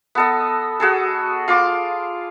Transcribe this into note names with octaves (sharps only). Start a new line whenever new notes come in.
B3 A4 D#5
F#4 G#4 A4
F4 C6 D6